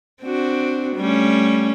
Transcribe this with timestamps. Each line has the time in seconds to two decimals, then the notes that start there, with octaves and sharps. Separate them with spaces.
0.23 C4 D4 F#4
0.97 G3 A3 C#4